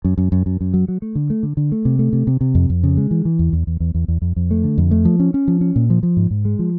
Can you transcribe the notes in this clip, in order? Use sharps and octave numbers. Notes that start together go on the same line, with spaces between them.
F#2
F#2
F#2
F#2
F#2
F#3
F#3
A3
D3
A3
D3
D3
A3
C3
A3
C3
C3
C3
F2
F2
C#3
G#3
E3
E3
E2
E2
E2
E2
E2
E2
F2
F2
A3
D3
F2
A3
F3
C#4
C#4
F3
C#4
A#2
F3
F3
G#2
G#2
G#3
F3